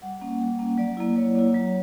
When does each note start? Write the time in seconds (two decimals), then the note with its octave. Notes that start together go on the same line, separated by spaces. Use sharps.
0.02 G3 F#5
0.21 A#3 C#4
0.41 G3
0.59 A#3 C#4
0.78 F#3 D5
0.97 A#3 E4
1.16 F#3 C#5
1.35 A#3 E4
1.54 F#3